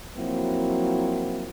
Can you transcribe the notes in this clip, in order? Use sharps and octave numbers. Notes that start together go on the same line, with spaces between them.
F3 F#3 A#3 C4 E4 F#4